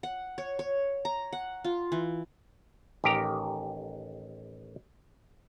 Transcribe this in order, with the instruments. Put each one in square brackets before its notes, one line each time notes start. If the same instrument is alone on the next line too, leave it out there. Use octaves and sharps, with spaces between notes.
[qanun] F#5
C#5
C#5
A#5
F#5
F4
E3
[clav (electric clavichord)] A1 D#3 G4 A#4 A#5